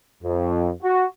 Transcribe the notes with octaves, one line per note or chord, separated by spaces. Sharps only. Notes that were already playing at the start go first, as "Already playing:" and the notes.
F2
F#4